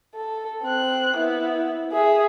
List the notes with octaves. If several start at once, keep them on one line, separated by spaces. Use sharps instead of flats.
A4
C4 F#6
B3 E4
G#4 E5